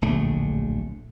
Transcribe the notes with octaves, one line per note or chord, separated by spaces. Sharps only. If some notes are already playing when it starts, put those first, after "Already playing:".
D1 A#1 D3 A3